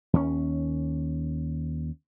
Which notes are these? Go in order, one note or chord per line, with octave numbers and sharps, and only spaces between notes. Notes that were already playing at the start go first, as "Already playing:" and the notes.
D#2 C#4